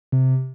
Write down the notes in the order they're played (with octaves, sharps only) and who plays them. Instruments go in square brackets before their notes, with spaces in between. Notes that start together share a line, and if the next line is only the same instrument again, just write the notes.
[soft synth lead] C3